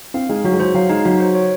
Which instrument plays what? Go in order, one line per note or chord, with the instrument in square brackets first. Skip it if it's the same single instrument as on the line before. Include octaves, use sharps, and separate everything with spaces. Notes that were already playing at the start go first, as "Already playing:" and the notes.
[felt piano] C4 [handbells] F5
[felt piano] G#3 [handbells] D#4
[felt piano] F#3 [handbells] F#4
[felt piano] G#3
[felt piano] F#3 [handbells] C5
[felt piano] F#3 [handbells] F5
[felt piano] G#3 [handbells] D#4
[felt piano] F#3 [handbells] F#4
[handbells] C5
C#5